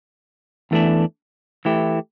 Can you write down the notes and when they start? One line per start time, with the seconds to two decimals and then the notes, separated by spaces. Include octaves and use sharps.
0.71 E2 E3 A3 D4
1.65 E3 A3 E4 G4